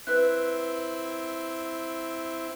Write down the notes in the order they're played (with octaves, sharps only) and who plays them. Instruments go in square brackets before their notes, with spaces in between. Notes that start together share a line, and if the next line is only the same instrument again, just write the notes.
[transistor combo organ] C4 E4 [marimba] B4 F#6